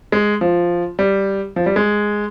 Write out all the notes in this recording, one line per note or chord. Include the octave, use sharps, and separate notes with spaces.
G#3
F3
G3
F3
G3
G#3